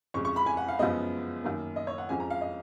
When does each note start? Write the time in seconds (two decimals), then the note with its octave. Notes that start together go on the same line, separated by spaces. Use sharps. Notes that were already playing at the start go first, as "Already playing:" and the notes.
0.14 F2 C#3 G#3 C#6
0.25 C#6
0.36 B5
0.46 G#5
0.57 F#5
0.68 F5
0.79 F#2 C#3 F3 G#3 B3 D#5
1.44 F#2 D#3 A#3
1.76 D#5
1.87 C#5
1.98 F#5
2.09 F2 F3 G#3 C#4 G#5
2.20 A#5
2.30 F5
2.41 D#5